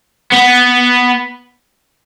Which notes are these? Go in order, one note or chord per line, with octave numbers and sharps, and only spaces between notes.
B3